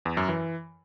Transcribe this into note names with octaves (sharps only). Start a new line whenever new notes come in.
E2
F#2
E3